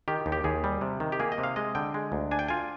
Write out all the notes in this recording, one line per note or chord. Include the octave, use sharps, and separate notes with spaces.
D#3 G4
D#2
G4
D#2 G#4
G3
C3
D#3
G4
A#3 G#4
D#5
C3
F5
G#3 D#5
D3 G5
G#3
D2
D4 G#5
G5
F4 G#5